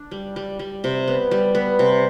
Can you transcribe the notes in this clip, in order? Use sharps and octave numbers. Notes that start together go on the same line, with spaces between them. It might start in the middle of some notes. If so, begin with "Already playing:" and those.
Already playing: D4
G3
G3
G3
C3
B3
G3
B3
C3